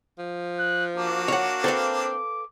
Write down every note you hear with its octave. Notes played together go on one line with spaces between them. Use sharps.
F3
F#6
A#3 D4 F#4
C#5 F#5
C4 A4 B4 F5
D6